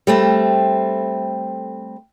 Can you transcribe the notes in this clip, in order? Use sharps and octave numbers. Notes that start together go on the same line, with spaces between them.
G3 A3 C4